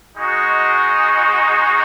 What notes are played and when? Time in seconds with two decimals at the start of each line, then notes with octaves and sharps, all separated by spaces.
0.16 G#3 D#4 F#4